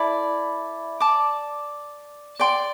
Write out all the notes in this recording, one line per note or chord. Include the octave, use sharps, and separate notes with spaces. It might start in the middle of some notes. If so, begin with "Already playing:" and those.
Already playing: E4 A4 D5
D5 A5 D6
D5 G5 C6